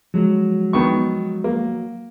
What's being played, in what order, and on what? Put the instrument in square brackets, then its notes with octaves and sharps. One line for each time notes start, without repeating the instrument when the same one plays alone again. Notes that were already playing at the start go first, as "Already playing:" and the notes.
[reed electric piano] F3 G#3 [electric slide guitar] F#3
[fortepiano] D#3 B3 C#6
A#3